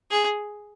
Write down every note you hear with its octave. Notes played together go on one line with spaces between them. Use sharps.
G#4